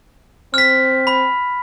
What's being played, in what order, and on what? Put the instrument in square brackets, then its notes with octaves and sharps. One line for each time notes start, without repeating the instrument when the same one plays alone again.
[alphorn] C4 [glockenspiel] F6 B6
[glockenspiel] B5